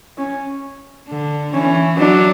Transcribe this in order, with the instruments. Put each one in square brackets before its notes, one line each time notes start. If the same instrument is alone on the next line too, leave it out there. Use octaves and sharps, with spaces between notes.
[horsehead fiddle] C#4
[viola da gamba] D3
[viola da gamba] E3 [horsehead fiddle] C#4
[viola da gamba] F#3 [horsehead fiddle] D4